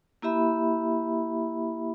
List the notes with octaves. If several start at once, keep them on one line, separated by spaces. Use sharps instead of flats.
A#3 E4 G4 E5 B5